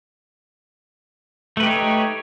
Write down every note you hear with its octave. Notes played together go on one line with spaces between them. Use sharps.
A3 D#4 G4 B4 C#5